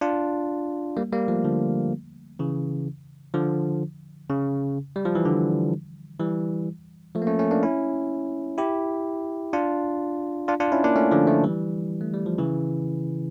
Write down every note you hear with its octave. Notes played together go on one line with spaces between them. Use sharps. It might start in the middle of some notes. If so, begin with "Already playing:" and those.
D4 F4
G3 A#3
G3 A#3
F3 A3
D3 F3
C#3 E3
D3 F3
C#3
G3
F3
E3
D3
E3 G3
F3 A3
A#3
A3 C#4
A3 C#4
A#3 D4
C#4 E4
E4 G4
D4 F4
D4 F4
D4 F4
C#4 E4
A#3 D4
A3 C#4
D3 F3
F3 A3
E3 G3
A3
G3
F3
C#3 E3